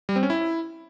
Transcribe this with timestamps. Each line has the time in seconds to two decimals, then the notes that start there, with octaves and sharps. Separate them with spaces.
0.09 G3
0.16 C4
0.23 C#4
0.30 E4